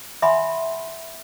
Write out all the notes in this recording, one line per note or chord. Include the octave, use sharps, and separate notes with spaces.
E5 F#5 G#5 B5 C6